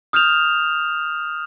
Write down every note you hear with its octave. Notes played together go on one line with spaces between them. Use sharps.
D#6 F6 G6 E7 F7